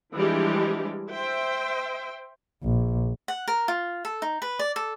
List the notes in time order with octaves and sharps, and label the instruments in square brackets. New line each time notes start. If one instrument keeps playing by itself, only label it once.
[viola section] E3 F3 G3 G#3 D4 G4
C5 E5 G5
[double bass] A#1
[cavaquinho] F#5
A#4
F4
A4
D#4
B4
D5
A4